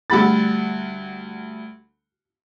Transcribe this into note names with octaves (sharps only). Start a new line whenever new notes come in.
D2 G3 F#5 B5 A6